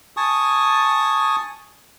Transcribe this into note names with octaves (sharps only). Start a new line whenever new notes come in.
G#5 A5 C#6 D#6